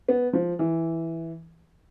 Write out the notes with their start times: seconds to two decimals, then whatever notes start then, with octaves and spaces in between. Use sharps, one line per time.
0.08 B3
0.33 F3
0.59 E3